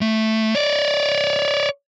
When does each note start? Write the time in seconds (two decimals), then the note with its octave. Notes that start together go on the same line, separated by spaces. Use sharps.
0.01 A3
0.55 C#5 D5